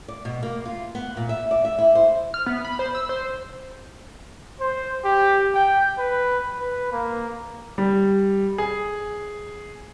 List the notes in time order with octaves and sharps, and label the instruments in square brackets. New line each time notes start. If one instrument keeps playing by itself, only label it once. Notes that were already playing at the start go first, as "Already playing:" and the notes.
[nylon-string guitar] D5
B2
A#3
F4
B3
A#2
E5
D5
E5
E4
C5
[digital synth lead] F6
B3
B5
C5
E6
C5
[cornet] C5
G4
G5
B4
B4
A#3
[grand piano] G3
G#4